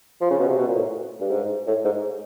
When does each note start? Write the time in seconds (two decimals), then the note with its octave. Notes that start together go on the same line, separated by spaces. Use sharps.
0.21 F3
0.31 C#3
0.40 B2
0.48 C3
0.58 B2
0.67 A#2
0.76 A2
1.21 G2
1.30 G#2
1.67 A2
1.85 G#2